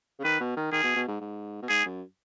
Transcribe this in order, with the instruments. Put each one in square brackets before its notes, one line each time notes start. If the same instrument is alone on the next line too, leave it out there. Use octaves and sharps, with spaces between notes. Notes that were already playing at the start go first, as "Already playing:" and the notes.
[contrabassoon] C#3
[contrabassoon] D#3 [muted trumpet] B4
[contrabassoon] B2
D#3
[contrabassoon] D#3 [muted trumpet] G#4
[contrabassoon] B2
B2
G#2
G#2
B2
[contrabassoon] G#2 [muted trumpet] G#4
[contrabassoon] F#2